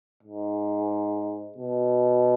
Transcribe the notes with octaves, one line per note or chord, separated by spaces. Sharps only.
G#2
B2